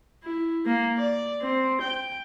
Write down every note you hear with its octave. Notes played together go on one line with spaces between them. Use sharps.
E4
A#3
D5
C4
G5